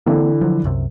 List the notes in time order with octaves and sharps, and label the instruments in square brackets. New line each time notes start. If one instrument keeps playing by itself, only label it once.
[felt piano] D3 E3 [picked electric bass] A#3 C4 D4
[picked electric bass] F3 F#3
C2 F#2 C3